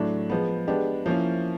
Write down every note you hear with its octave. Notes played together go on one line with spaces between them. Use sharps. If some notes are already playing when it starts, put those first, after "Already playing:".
Already playing: A2 F#3 A3 D4
F3 G#3 B3
G#3 B3 D4 G4
F3 A#3 C#4 E4